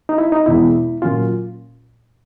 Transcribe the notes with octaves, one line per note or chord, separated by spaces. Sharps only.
D#4
E4
D#4
E2 B2 G#3 E4
A#2 F#3 A#3 C#4 F4